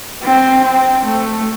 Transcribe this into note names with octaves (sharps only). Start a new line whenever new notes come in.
C4
C4
A3